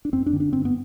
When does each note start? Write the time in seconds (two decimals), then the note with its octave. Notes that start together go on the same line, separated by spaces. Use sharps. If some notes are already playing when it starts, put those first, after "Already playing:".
0.05 D4
0.13 F#2 C4
0.26 D4
0.33 D3
0.40 D4
0.53 G2 C4
0.65 B3